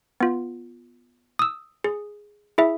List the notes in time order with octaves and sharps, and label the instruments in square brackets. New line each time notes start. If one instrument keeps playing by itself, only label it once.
[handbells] B3 F4
D#6 E6
G#4
E4 G#4 E5